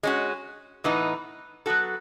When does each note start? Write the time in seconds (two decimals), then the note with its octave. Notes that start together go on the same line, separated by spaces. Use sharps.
0.03 G#3 C#4 F#4
0.84 A2 E3 B3 D#4
1.66 F#3 B3 F#4 A4